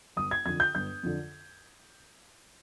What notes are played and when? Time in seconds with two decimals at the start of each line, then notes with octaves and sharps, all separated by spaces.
0.16 G1 D#6
0.31 G#6
0.45 F2 D3 G#6
0.60 G6
0.75 G1 G6
1.03 F2 D3